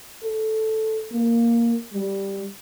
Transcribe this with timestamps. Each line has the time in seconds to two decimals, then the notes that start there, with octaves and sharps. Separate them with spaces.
0.23 A4
1.12 A#3
1.94 G3